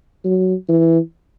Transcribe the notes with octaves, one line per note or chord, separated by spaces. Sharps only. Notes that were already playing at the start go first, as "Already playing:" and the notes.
F#3
E3